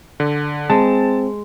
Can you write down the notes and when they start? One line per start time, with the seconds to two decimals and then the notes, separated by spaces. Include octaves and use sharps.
0.20 D3
0.70 G#3 C4 A5